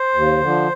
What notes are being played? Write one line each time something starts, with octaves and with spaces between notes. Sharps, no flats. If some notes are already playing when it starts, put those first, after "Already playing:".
Already playing: C5
D#2
D3 F3